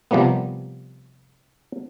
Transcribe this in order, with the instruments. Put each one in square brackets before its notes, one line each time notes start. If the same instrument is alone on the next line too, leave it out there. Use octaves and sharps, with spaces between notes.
[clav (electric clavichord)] C3 F3 G3 A#3 B3